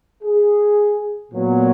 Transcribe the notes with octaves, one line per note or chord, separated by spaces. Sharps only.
G#4
A#2 F#3 B3